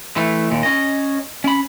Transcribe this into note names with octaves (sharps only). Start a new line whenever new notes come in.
E3 A3
D#2 A#2
C#4 D#5
C#4 B5